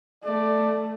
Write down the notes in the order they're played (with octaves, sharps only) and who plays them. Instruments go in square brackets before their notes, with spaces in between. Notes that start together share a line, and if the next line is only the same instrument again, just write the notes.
[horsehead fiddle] A3 [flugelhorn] D5